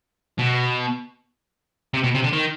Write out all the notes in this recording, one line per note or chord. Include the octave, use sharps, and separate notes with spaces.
B2
C3
B2
C3
D3
D#3